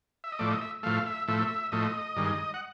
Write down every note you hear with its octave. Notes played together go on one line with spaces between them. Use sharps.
E5
D#5
A2 F3 A3 D5
D#5
E5
A2 F3 A3 F5
E5
A2 F3 A3 E5
A2 F3 A3 D#5
G2 D#3 G#3
F#5